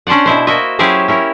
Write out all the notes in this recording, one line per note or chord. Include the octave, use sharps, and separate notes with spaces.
C#4 D4 C5 D5 F#5
B2 E4 C5
A#3 E4 F#4 D#5 E5
F#3 C#4 E4 G4 G#4 C5
C#4 E4 A#4